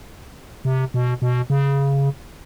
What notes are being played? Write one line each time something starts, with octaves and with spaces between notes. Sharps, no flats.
C3
B2
B2
C#3